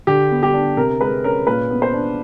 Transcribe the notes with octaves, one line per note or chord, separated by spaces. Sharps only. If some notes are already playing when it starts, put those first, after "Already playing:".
D3 G4
B3
G4
D4
C3 A#4
G#3 B4
C#4 A#4
A#2 B4
B3
C5
D4